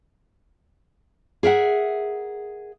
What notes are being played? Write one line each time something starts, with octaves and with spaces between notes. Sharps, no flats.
G#4 A#4 E5 F#5